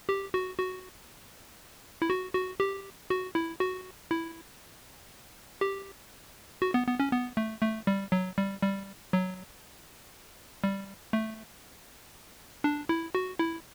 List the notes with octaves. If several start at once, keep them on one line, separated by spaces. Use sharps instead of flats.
G4
F#4
F#4
E4
F#4
F#4
G4
F#4
E4
F#4
E4
G4
F#4
B3
B3
C#4
B3
A3
A3
G3
F#3
G3
G3
F#3
G3
A3
D4
E4
F#4
E4